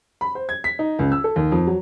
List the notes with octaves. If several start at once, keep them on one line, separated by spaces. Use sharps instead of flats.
B5
C5
G#6
B6
D#4
C#2
E6
A4
D#2
F2
F#3